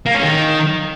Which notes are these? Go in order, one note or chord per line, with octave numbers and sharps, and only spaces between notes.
A#3
C#4
D#3